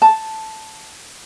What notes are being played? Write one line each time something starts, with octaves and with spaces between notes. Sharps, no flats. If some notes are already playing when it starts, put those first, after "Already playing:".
A5